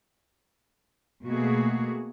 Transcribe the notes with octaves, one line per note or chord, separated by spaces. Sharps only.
B2 A3 A#3 F#4 G#4